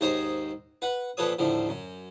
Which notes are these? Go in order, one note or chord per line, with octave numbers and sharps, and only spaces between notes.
D#2 G#2 C5 C#5 D#5 A#5
B4 F#5 B5
A#2 F3 A4 B4 C#5 D#6
D#2 A2 D3 F3
F#2